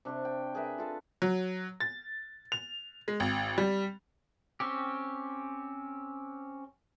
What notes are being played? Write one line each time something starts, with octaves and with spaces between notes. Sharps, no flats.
C3 D4 C5 C#6
G5
G#4 A#4 B4 E5
F4 A4 F5
F#3
A6
F7
G#3
G#1
G3
C4 C#4 G4